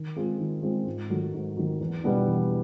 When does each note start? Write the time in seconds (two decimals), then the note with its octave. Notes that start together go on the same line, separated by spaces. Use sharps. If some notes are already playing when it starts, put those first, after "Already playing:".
Already playing: D#3
0.16 G#3 C4 F4 G#4
0.40 D#3
0.63 G#3 C4 F4 G#4
0.87 G#2
1.10 D#3 F#3 A3
1.34 G#2
1.57 D#3 F#3 A3
1.80 E2
2.04 B2 G3 B3 D4
2.27 E2